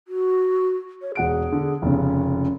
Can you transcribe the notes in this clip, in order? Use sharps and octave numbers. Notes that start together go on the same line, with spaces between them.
F#4
C#5
E1 G#4 F#5 D7
D3
F1 C#3 C#4